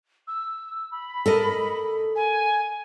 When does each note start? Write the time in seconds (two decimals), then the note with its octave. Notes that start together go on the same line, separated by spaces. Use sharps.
0.27 E6
0.91 B5
1.26 A4 A#4 D#5
2.15 G#5